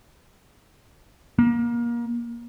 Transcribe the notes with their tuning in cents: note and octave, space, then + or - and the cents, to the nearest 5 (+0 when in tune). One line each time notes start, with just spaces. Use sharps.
A#3 +25